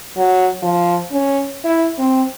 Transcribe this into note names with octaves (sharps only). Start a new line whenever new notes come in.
F#3
F3
C#4
E4
C4